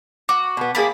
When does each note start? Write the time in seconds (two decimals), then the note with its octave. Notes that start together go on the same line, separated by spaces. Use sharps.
0.29 F#4 D6
0.57 B2 B3
0.75 A2 A#3 E4 G#4 D5 B5